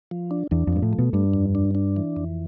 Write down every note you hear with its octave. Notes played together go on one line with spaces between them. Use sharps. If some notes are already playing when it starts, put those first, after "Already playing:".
F3
D4
E2 D4
F2
G2 F3
A2
A3
B2
G2 D4
F2
D4
D4
E3
F2